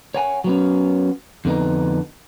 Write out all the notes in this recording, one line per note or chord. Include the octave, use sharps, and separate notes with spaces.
C#5 F#5 G#5
F#3 B3 C#4
F2 D3 B3 D#4